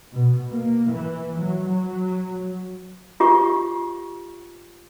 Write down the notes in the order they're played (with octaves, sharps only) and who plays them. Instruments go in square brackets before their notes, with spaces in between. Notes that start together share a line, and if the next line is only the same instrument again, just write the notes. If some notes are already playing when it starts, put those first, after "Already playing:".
[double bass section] B2
A#3
E3
F#3
F#3
[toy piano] F4 G4 C#6